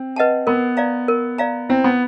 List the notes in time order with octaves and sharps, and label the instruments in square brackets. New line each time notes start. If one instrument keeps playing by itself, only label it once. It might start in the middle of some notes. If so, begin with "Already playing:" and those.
Already playing: [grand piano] C4
[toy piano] B4 D#5 F#5 A5
[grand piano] B3 [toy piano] A#4
[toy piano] D5 F5 A#5
A#4
D5 F5 A#5
[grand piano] C4 [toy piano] E4
[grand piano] B3